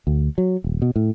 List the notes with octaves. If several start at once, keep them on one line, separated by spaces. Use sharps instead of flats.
D2
F#3
D#1
B2
A2